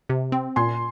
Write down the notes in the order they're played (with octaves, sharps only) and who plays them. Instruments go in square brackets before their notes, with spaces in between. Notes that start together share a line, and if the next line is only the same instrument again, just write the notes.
[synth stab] C3
C4
[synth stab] A#2 [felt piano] G#5 C6